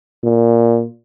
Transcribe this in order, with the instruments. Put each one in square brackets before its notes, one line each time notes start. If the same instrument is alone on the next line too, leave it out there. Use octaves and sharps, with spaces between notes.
[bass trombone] A#2